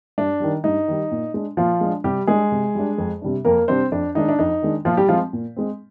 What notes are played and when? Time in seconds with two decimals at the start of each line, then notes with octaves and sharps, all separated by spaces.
0.18 G2 D4
0.40 D#3 G3
0.64 G2 D#4
0.88 D#3 G3
1.12 A#2
1.34 G#3 D4
1.57 A#2 F3 F4
1.81 G#3 D4
2.04 C3 G3 G4
2.27 G3 G#3 D4 G#4
2.52 C3
2.75 G3 D4
2.98 F2
3.22 C3 G3 D4
3.45 F2 A#3 A#4
3.68 C3 G3 C4 D4 C5
3.92 F2 D4
4.15 D#3 G#3 D4 D#4
4.29 D4
4.39 F2 D#4
4.62 D#3 G#3 D4
4.85 A#2 F3 F4
4.97 G3 G4
5.09 F3 G#3 C4 F4
5.33 A#2
5.56 G#3 C4